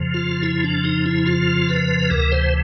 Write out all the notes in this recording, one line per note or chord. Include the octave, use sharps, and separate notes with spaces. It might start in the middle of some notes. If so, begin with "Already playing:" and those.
Already playing: F2 C#3 F3
F4
E4
D4
D#4
E4
F4
B4
D2 C3 E3 A#4
C5